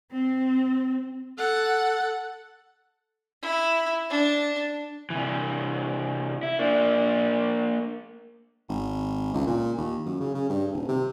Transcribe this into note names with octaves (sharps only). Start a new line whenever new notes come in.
C4
A4 F#5
E4
D4
C3 E3
E4
A#3 D4
G#1
C#2
A#2
D#2
F#2
C#3
C#3
G2
D#1
C3